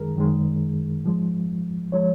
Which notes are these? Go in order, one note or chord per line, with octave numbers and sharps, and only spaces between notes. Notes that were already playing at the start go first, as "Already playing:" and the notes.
Already playing: F#2 D#3 G#3 G#4 A#4
F#2 D#3 G#3
G#2 F3 G#3
F3 G#3 C#5